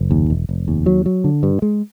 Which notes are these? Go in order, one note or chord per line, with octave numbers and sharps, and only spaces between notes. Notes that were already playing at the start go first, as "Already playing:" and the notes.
Already playing: F#1
D#2
E1
F1
D#2
F#3
F#3
D3
G2
G#3